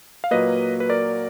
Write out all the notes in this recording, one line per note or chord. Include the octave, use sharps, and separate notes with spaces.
F5
A#2 F#3 A#3 B4 D#5
B4
A#4 D5